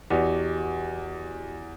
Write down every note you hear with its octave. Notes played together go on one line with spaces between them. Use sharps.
E2 F#4 G4 D#5